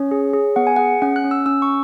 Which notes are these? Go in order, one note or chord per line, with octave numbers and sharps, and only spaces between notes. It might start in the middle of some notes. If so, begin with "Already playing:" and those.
Already playing: C#4 C#5
G#4
G#4
B3 F#5
G#5
G#4 F#5
C#4 F#5
F#6
C#4
E6
C#4 E6
C#6